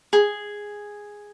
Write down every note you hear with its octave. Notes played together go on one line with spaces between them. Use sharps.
G#4